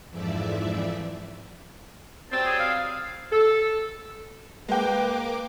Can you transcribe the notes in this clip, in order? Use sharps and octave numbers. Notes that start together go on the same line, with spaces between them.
F2 G#2 E3 F3 D5 E5
F#3 G3 C4 A5
G#4
F5
A4
G#3 A#3 B4 G5 D6